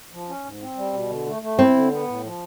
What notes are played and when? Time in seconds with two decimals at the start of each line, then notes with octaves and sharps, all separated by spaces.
0.13 F3
0.29 C#4
0.45 G#2
0.61 C4
0.77 G3
0.93 B2
1.10 D3
1.27 A3
1.42 A3
1.59 C4 E4
1.75 D3
1.92 B3
2.07 A2
2.24 F3